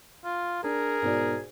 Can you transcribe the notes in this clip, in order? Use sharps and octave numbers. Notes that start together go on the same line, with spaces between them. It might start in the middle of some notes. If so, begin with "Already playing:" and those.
F4
D4 G#4 A#4
G#2 B2 D5